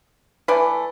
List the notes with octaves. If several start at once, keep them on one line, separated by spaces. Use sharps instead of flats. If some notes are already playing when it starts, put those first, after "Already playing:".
E3 A3 B4 D5